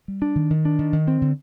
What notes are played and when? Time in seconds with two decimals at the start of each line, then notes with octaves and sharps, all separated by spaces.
0.08 G3
0.22 D4
0.36 D#3
0.50 D#3
0.65 D4
0.79 D#3
0.93 D#3
1.08 C4
1.22 D3